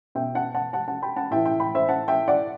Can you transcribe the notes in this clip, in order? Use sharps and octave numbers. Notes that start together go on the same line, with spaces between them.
B2 E5 G5
F#5 A5
F#5 A5
F#5 A5
F#5 A5
G5 B5
F#5 A5
A2 E3 E5 G5
E5 G5
G5 B5
C5 E5
F#5 A5
E5 G5
D5 F#5